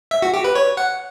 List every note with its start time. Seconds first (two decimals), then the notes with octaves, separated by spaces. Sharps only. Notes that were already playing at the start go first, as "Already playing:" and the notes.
0.11 E5
0.22 F#4
0.34 G4
0.44 B4
0.55 C#5
0.77 F#5